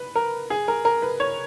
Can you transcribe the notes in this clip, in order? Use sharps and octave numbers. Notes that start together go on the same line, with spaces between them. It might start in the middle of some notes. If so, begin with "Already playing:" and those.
Already playing: B4
A#4
G#4
A#4
A#4
B4
C#5